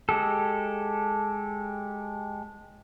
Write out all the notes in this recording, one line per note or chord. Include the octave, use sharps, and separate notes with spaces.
G#3 G4 A4